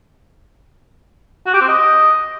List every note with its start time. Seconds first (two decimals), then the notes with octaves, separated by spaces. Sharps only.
1.46 F#4
1.54 G4
1.61 C4
1.68 D#5